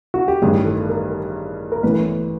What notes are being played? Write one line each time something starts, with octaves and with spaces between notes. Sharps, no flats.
F#4
G4
A1 G2 D#3 G#4
A4
A#4
A#4
A1 A2 E3 B4